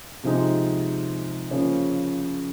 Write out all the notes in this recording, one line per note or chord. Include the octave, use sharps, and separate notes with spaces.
C3 F3 G#3 D#4
C#3 F3 A#3 C#4